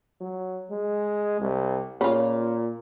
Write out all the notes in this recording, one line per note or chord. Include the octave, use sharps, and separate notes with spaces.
F#3
G#3
C2
A#2 C#3 F4